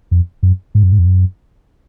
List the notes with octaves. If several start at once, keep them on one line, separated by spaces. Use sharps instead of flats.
F2
F#2
G#2
F#2
G#2
F2
F#2